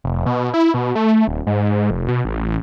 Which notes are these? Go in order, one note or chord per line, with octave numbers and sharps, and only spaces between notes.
F1
B2
E4
B2
A3
D#1
G#2
F1
B2
A1